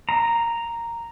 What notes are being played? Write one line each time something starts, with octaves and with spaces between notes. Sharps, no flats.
A#5